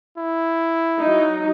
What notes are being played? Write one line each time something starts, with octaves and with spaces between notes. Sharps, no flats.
E4
F#3 D#4